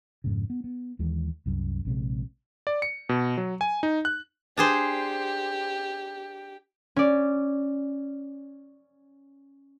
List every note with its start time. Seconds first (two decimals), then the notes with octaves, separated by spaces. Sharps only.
0.24 F2 G#2 C#3
0.50 B3
0.64 B3
0.99 D#2 E3 G#3
1.46 C2 F#2
1.85 A#1 C3 G#3
2.67 D5
2.82 C#7
3.09 B2
3.38 F#3
3.61 G#5
3.83 D#4
4.05 F#6
4.57 D4 G4 G#4 C5
6.96 C#4 D5